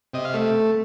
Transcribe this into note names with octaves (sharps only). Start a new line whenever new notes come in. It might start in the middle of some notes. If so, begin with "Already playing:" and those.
C3 D#5
F5
A3